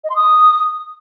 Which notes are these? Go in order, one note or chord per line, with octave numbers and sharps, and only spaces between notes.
D#5
C6
D#6